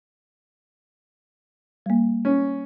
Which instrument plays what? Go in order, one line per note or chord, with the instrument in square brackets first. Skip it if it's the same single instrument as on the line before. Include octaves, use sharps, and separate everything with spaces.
[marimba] G3 A#3
[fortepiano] C#4